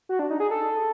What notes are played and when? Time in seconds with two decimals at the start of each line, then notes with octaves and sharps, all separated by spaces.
0.09 F#4
0.19 D4
0.30 D#4
0.40 G#4
0.51 A4